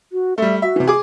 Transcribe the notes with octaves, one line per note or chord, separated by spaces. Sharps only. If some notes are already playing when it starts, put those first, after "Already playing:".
F#4
G3 A3 E5
F#4 E5
C3 E3
G#4 D6